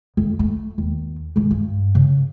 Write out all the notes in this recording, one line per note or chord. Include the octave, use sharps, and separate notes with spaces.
F2
A3
D#2
G#2 E3
G2
C#3